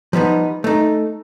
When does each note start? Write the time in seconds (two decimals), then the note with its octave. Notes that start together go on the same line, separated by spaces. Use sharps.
0.13 F3 G3 B3 D#4
0.64 A3 D#4